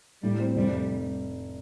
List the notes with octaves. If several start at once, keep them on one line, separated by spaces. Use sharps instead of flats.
A2 G3
C4
F1 G3